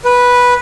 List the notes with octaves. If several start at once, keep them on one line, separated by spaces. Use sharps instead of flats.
B4